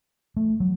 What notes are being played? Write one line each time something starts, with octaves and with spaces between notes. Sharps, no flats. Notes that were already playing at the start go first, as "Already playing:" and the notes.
A3
F#3